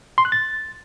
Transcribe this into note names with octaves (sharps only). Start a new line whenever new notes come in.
C6
F#6
A6